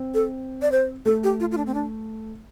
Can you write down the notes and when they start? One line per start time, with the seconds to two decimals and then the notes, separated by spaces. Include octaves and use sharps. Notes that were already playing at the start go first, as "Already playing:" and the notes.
Already playing: C4
0.14 A4
0.62 D5
0.72 C5
1.06 A3 A4
1.24 G4
1.40 F4
1.52 F4
1.57 D4
1.67 C4
1.74 D4